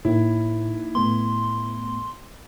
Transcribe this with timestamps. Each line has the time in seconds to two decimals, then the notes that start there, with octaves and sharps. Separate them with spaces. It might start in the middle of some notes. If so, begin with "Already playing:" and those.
0.05 A2 A#3 D#4 E4
0.95 A2 A3 B3 C6